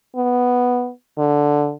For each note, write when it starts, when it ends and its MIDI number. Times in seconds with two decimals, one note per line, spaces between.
0.16 0.90 59
1.18 1.73 50